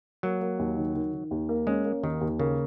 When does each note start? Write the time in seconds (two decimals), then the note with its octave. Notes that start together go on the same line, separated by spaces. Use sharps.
0.23 F#3 A#3
0.41 A#3
0.59 D#2
0.77 D#3
0.95 D#3
1.13 D#3
1.31 D#2
1.49 A#3
1.67 G#3 C#4
1.85 A#3
2.03 D#2 D#3
2.21 D#2
2.39 C#3 A#3